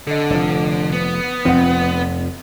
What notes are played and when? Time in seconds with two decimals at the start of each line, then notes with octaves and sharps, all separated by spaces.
0.07 D3 A4 D#5
0.30 F1 F3
0.92 B3
1.45 F1 F2 F3 C4 F#5